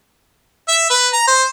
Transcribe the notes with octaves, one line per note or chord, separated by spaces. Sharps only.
E5
B4
A#5
C5